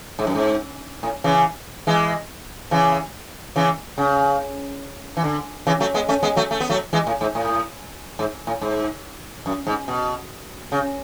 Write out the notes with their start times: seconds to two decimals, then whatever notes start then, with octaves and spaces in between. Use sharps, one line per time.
0.19 G#2
0.27 F#2
0.35 G#2
1.03 A2
1.24 C#3 E3
1.87 E3 G#3
2.71 C#3 E3
3.56 C#3 E3
3.98 C#3
5.17 E3
5.24 D3
5.67 C#3 E3
5.80 F#3 A3
5.94 G#3 B3
6.09 A3 C#4
6.23 G#3 B3
6.36 F#3 A3
6.51 A3
6.61 B3
6.69 F#3 A3
6.93 E3 G#3
7.07 A2
7.21 G#2
7.35 A2
8.19 G#2
8.47 A2
8.61 G#2
9.46 F#2
9.67 G#2
9.88 B2
10.72 C#3